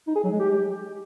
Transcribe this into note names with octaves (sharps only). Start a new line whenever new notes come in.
D#4
G#4
F#3
G#3
G4